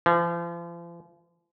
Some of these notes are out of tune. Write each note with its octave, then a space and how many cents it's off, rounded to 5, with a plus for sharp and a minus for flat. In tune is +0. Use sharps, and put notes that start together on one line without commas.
F3 -40